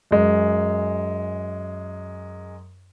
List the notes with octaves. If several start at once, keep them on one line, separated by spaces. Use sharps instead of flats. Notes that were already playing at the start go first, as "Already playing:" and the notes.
F#2 G#3